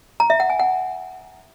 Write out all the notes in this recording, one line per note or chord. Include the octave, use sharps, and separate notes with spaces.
A#5
E5
F#5
G#5
F#5